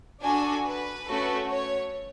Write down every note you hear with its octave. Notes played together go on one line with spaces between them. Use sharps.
D4 F#4 A4 G#5
B4
A3 C#4 F#4 A4
C#5